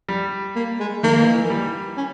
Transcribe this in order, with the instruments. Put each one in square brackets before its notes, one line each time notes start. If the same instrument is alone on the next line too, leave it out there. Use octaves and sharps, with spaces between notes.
[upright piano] G3
[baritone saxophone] A#3
G#3
[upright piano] D#3 [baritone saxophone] A#3
[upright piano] E3
E3
G3
[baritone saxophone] C#4